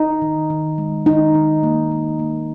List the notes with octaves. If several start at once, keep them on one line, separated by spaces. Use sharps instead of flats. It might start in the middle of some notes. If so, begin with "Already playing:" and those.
Already playing: D#4
D#3
D#3
G#3
D#3 D#4
D#3
A#3
A#3
A#3